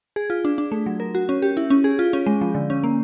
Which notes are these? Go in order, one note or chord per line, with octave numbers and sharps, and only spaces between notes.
G#4
F4
D4
D4
A3
F#3
A#4
F#4
C#4
G4
E4
C#4
G#4
F4
C#4
G#3
F3
D3
C#4
A#3